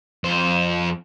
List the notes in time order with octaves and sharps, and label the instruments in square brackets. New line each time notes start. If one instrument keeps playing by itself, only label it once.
[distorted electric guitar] F2 C5